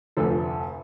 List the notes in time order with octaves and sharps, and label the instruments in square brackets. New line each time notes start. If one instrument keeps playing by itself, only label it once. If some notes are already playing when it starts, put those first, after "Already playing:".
[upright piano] F1 D2 F3 A4